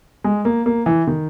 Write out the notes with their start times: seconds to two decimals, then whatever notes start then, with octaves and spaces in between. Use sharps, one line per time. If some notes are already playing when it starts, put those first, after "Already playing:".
0.24 G#3
0.45 A#3
0.66 A#3
0.86 E3
1.07 D#3